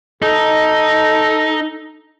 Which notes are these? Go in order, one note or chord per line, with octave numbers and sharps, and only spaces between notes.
D#4 A4